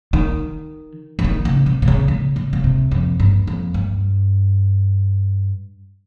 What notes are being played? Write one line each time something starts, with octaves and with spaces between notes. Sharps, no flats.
D#3
F3
D#3
C#3
C3
C3
C#3
C#3
C#3
C#3
C3
F2
G2
F2
G2